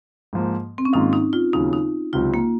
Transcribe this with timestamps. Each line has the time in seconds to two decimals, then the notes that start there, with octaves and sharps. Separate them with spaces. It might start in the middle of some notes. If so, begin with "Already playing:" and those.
0.33 G#2 F3 A#3
0.78 C4
0.85 C#4
0.93 G#2 D#3 A#3 D#4 F4
1.13 D#4
1.33 F4
1.53 D#2 C#3 F#3 D#4
1.73 D#4
2.13 C#2 C3 F#3 F4
2.34 A#3